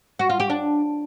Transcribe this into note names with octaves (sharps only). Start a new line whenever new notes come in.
F#4
F4
G4
D4